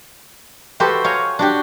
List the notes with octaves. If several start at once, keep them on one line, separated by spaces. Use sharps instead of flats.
F#4 G4 A4 B4 C5 E5
C#5 F5 G#5 A#5
D4 F#4 G4